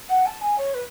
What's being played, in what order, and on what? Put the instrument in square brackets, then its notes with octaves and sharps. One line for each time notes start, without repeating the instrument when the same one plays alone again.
[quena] F#5
A5
G#5
C#5
B4